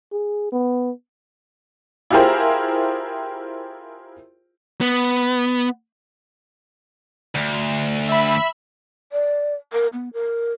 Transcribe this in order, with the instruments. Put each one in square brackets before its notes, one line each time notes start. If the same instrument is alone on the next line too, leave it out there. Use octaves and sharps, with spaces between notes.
[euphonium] G#4
B3
[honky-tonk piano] E4 F4 G4 G#4 A#4 C5
[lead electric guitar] B3
[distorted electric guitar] D2
[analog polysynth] E5 B5
[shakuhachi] D5
A#4
B3
A#4